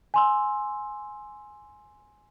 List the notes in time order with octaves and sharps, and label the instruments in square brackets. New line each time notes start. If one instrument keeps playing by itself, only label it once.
[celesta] G#5 C6 E6